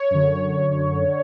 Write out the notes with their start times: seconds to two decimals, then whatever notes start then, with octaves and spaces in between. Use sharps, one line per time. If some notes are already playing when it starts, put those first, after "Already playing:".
Already playing: C#5
0.11 F#2 D3
1.07 D3